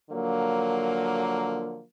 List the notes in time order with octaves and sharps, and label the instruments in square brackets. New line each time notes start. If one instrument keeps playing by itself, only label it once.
[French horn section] D3 F3 F#3 A#3